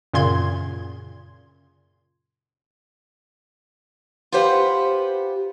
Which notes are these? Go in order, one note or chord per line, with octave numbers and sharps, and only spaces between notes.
F#2 A#2 C#3 C6 G#6
F4 G4 B4 C5 F#5